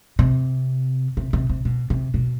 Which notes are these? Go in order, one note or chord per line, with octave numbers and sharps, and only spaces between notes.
C3
C3
C3
C3
B2
C3
B2